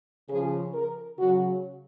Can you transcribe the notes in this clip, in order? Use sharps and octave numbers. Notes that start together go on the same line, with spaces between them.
C#3 F3 G#4
A#4
C#3 F#3 F#4